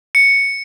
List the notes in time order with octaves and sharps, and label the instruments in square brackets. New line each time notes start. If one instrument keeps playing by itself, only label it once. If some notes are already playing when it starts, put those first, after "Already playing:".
[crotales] C#7